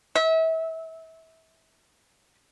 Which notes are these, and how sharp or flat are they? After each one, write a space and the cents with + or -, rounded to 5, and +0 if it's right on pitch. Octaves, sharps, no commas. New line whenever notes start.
E5 -30